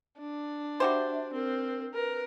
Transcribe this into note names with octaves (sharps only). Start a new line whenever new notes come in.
D4
F#4 G4 C5 E5
C4 A#4
A#4 B4